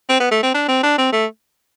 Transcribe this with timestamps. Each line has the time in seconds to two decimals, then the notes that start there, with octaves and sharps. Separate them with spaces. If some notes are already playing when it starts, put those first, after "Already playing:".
0.09 C4
0.20 B3
0.31 A3
0.43 C4
0.54 D4
0.68 C4
0.83 D4
0.98 C4
1.12 A3